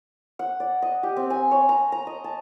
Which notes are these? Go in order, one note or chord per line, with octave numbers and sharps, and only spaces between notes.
F#5
D5
D#5
G4
C4
G#5
C#5
A#5
A#5
D#5
A5